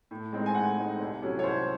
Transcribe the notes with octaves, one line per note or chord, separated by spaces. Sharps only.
A2
G#3 C4 D#4
G#5
A2 F#5
G#3 C4 D#4
C2
C3 F#3 C#4 E4
C#5
C2 C5